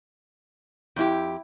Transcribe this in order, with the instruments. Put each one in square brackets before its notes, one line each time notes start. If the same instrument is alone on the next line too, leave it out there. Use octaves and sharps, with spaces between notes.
[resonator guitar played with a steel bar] F2 G4 [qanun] E4 G5